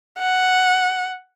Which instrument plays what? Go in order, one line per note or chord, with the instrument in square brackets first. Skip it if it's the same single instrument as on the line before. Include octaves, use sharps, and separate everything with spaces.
[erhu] F#5